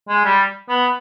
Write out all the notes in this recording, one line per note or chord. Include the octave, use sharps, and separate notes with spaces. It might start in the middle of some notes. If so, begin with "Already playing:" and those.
G#3
G3
B3